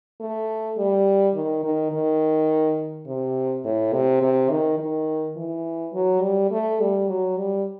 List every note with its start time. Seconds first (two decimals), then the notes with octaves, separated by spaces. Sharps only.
0.20 A3
0.77 G3
1.35 D#3
1.64 D#3
1.92 D#3
3.07 C3
3.65 A2
3.93 C3
4.22 C3
4.50 D#3
4.79 D#3
5.37 E3
5.93 F#3
6.23 G3
6.51 A3
6.80 G3
7.09 F#3
7.37 G3